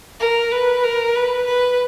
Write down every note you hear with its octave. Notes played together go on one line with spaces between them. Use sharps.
A#4
B4
A#4
B4
B4